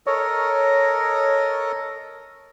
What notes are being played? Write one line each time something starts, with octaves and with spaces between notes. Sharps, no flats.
A4 A#4 C#5 D#5